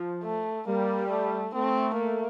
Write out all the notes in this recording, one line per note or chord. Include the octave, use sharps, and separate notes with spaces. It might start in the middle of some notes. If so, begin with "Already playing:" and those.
Already playing: F3
A3
G3 A#3
A3
A3 C4
A#3